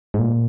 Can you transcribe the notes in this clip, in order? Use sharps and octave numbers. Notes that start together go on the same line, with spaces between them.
G#2
A#2